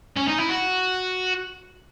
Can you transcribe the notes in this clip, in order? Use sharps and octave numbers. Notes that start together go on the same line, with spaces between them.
C#4
D#4
E4
F#4